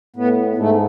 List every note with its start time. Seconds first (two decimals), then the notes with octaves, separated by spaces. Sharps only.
0.16 A2 B3
0.58 G#2 A3